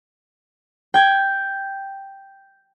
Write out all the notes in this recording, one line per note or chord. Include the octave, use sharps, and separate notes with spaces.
G5 G#6